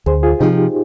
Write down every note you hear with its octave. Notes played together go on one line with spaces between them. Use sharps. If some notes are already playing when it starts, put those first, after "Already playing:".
D2 G#4 C5
F4 G#4
C3 F3 D#4 G4